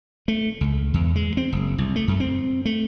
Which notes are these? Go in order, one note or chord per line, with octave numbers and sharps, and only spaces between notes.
A3
C#2
E2
G#3
C4
F#1
C2
A3
F#2
C4
A3